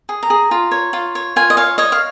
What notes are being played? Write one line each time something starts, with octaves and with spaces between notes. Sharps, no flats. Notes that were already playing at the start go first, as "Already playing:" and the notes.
G#4
A#5
G#4
F4
C#5
F4
C#5
F4 G#5
D#5
C#5 F5
C#5 D#5
F5